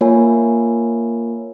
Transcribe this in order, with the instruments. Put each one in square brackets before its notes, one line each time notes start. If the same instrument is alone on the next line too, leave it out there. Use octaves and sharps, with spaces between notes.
[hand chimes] A#3 F4 A#4 C#5 G#5